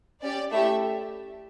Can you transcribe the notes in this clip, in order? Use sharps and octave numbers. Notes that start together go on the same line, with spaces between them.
C#4 G4 D5
A3 E4 G4 E5